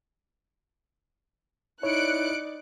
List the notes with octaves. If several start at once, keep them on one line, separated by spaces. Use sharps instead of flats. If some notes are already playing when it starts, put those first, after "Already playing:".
D#4 E4 C#5 D5 F#6 C#7 D7